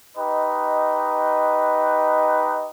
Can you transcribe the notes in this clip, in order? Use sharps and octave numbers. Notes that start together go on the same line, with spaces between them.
D#4 G4 B4 D#5